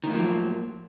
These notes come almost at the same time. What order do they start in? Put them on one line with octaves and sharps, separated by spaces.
D#3 A2 A#3 F3 F#3